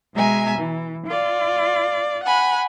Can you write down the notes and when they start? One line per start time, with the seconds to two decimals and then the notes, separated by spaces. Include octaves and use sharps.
0.14 B2 G#3 E5 G#5 A#5
0.57 E3
1.07 F4 D5
2.23 F#5 G#5 B5